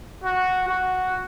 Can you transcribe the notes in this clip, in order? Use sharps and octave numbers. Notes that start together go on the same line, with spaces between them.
F#4
F#4